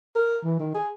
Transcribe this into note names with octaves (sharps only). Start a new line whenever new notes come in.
A#4
E3
D#3
G#4